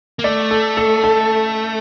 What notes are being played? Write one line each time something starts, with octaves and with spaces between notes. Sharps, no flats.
A#3
A3 D5
A4
A4
A4